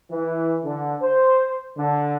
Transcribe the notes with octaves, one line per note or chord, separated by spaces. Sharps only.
E3
D3
C5
D3